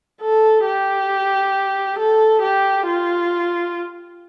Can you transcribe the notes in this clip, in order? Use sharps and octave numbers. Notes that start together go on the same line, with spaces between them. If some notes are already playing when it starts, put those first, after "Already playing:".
A4
G4
A4
G4
F4